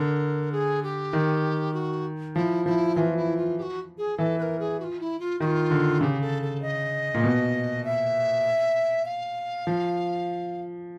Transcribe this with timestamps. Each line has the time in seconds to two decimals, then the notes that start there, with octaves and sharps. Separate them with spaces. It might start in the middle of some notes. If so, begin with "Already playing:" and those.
Already playing: D3 A#4
0.52 G#4
0.83 G4
1.13 D#3
1.74 F#4
2.35 F3 E4
2.66 F3 E4
2.96 E3 F4
3.17 E4
3.37 F4
3.58 G4
3.62 F#4
3.98 G#4
4.18 E3 A4
4.39 B4
4.42 A#4
4.59 G#4
4.80 F#4
4.84 F4
5.00 E4
5.20 F4
5.40 D#3 F#4
5.45 F4
5.70 D3
6.01 C#3 G4
6.21 A4
6.42 A4
6.62 D#5
7.14 A#2
7.24 B2
7.84 E5
9.06 F5
9.67 F3